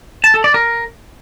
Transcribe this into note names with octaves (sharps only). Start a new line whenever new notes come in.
A5
A4
D5
A#4